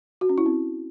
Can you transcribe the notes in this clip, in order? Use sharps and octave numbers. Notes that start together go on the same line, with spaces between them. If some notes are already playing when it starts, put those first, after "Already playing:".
F#4
C#4
E4
C4